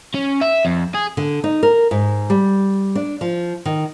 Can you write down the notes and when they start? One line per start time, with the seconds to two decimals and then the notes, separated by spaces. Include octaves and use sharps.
0.14 C#4
0.41 E5
0.65 F2
0.95 G#4
1.17 D3
1.44 D#4
1.63 A#4
1.91 G#2
2.30 G3
2.95 D4
3.21 F3
3.66 D#3